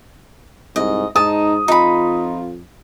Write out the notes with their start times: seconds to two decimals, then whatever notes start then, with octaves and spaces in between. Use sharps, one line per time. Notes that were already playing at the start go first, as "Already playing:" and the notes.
0.76 C2 G#2 D#5
1.16 G#2 D#4 A5 D#6
1.68 F2 D#4 F4 B5